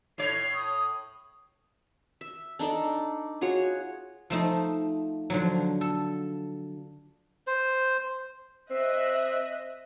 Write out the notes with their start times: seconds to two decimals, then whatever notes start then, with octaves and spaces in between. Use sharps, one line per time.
0.18 A2 C#5 C7
0.54 D#6
2.21 E5
2.59 D4 D#4 A4 D5
3.41 F4 F#4 G#4 C#5
4.30 F3 A3 D#4
5.30 D3 F3 F#3
5.81 A4
7.47 C5
8.71 C4 D#5 E5 F#6